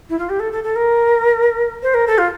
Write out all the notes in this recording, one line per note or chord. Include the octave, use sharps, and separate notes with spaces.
E4
F4
G4
A4
A4
A4
A#4
C5
A#4
A4
F4